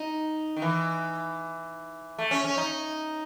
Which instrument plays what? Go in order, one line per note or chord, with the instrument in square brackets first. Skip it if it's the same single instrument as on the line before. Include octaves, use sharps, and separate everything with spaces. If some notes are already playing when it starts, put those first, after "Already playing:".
Already playing: [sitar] D#4
D#3
E3
A3
C#4
C#4
D#4